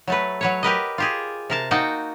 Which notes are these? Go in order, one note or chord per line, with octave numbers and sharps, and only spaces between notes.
F#3 A3 B4
F#3 B4 C#5
G4 A#4 B4 D#5
F4 G4 G#4
C3 A#4 A5
A#3 D#4 F#4 F#5 G5 A5